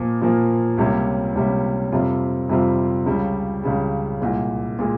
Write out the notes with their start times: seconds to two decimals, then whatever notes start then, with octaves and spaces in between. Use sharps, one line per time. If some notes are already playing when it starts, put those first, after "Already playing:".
Already playing: A#2 F3 A#3
0.21 A#2 F3 A#3
0.78 C#2 C3 G3 A#3 C#4
1.35 C#2 C3 G3 A#3 C#4
1.92 F2 C3 G3 C4 F4
2.49 F2 C3 G3 C4 F4
3.06 C#2 C#3 G3
3.64 C#2 C#3 G3
4.20 C2 A#2 G#3
4.79 A#2 G#3